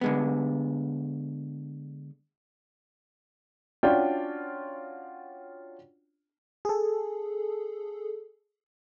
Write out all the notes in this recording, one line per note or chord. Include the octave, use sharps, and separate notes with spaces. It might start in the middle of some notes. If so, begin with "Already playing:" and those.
D3 G#3 B3
C#4 D4 F4 F#4 D5 G5
G#4 A4